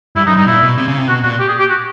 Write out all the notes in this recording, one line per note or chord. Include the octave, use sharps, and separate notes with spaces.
G2 E4
F#2 D#4
G2 D#4
A#2 E4
B2
C3
C#3
C3
B2 F#4
A#2 F#4
G4
G#4
G4
F#4